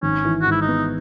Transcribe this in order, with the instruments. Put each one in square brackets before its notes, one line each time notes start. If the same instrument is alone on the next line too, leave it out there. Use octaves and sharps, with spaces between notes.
[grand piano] G#1 [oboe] C#4
[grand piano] E3
[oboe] F#4
[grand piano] G#2 [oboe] E4
[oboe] D#4
[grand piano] B3